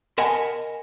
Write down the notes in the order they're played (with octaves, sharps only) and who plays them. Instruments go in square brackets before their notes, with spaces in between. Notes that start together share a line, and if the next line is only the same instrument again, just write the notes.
[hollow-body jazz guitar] A#4 D#5 F#5 G#5 A5 B5